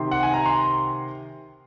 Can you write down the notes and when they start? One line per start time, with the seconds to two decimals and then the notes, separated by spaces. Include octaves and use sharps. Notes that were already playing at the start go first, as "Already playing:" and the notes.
Already playing: C3 D#3 C6
0.11 F#5
0.23 G#5
0.34 A#5
0.46 C6